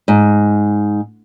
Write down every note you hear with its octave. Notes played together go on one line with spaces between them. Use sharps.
G#2